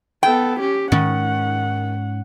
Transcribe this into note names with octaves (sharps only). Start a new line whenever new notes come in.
B3 A4 G5
C#4 G4
G#2 D#3 C#4 F#5